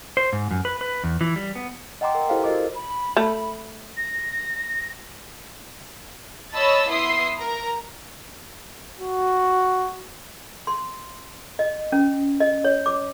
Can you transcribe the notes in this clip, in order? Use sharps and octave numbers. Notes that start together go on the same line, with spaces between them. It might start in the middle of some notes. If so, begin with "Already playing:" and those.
C5
G#2
F#2
B4
B4
E2
E3
G3
B3
D#5 F#5 G5 A#5 C6 D6
A#4
E4 G4 A4 C5 F5
F#4 A#4 C5 D#5 D6
B5
A3
A#6
C#5 D#5 A5 B5 E6 A6
B3 E4 E5 C6 D#6 C7
A#4 A#5
F#4
C6
D#5
C#4
D#5
C#5
D6